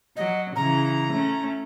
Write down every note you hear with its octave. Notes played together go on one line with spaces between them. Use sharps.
F#3 D#5
C#3 E3 A#5
A3 C#4